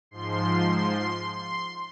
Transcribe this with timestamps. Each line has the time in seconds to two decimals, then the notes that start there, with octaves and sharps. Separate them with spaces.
0.11 G#2 F3 C6
1.32 C6